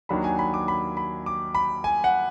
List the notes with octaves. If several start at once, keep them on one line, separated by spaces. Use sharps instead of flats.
D#2 D#3 F#3 D4 B5
G#5
B5
D6
B5
B5
D6
B5
G#5
F#5